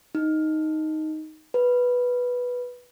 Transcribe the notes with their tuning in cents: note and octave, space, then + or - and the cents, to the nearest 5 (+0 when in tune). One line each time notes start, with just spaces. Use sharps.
D#4 +5
B4 -5